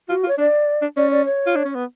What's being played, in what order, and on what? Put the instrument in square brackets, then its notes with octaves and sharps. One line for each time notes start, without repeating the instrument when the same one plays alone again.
[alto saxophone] F4 [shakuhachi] F#4
[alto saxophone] F4
[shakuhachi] C#5
[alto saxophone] D4 [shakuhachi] D5
[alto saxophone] D4
[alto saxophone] C#4 [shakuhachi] D5
[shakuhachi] D5
C#5
[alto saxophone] F4
D4
C#4
B3